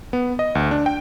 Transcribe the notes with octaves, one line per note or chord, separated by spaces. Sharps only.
B3
D#5
D2
D4
G5